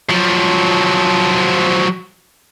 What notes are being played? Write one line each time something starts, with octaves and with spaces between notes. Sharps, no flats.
F3 F#3